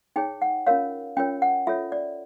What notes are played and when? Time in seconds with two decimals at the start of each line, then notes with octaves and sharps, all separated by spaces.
0.16 D#4 G#4 C#5 G5
0.42 F#5
0.67 C#4 F4 A#4 C#5 F5
1.17 C#4 F4 A#4 C#5 G5
1.42 F#5
1.67 F4 A4 C#5 E5
1.92 D5